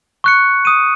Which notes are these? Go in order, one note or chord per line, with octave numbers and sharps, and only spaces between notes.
C#6 F#6 C#7
D#6 D#7